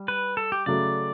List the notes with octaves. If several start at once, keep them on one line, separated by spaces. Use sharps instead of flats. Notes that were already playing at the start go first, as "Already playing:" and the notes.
Already playing: G3
B4
A4
G4
C#3 F#3 A3 D5